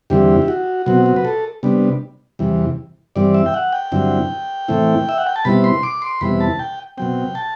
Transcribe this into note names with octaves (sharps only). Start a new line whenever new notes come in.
E2 D3 G3 C4 E4 G4
E4
F#4
B2 F#3 C4 F#4
F#4
B4
A4
C3 G3 B3 D4
E2 C3 E3 G3
G2 E3 G3 C4 D5
E5
G5
F#5
G5
G2 D3 F#3 C4 E4
A2 E3 A3 C4 E4
E5
F#5
G5
A5
B2 G3 C4 E4 B5
C6
D6
C6
E2 B2 G3 C4 E4 B5
A5
G5
B2 F#3 C4 G5
A5